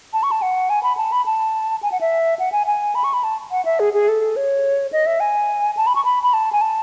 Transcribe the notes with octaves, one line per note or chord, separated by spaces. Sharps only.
A5
C#6
A5
F#5
G#5
B5
A5
B5
A5
G#5
F#5
E5
F#5
G#5
G#5
B5
C#6
B5
A5
F#5
E5
G#4
G#4
A4
C#5
D#5
E5
G#5
A5
B5
C#6
B5
B5
A5
G#5
A5